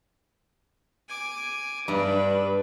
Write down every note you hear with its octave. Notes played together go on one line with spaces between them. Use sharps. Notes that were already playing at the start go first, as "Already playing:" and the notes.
G#5 D6
G2 D4 B4